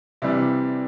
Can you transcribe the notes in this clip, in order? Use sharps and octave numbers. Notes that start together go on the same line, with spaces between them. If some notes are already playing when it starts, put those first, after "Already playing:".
C3 E3 G3 D4